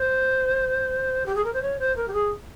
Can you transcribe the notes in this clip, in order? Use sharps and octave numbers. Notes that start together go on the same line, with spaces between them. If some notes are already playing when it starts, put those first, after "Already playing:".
Already playing: C5
G4
G#4
A#4
C5
C#5
C5
A#4
G4
G#4